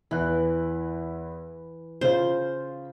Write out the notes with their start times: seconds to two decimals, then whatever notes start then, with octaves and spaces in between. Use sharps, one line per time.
0.11 E2 E3 E4 F#6
2.01 C#3 F4 C5